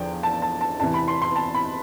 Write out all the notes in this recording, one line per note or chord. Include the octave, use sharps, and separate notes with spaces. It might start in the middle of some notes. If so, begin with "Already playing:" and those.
Already playing: E2 D3 F3 G5
A5
A5
A5
E2 C3 E3 A5
B5
C6
C6
A5
B5